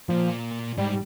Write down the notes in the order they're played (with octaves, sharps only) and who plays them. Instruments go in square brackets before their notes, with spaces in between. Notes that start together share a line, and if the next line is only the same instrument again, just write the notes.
[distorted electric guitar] A#2 [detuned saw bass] F3
[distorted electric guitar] G#2 [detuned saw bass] G3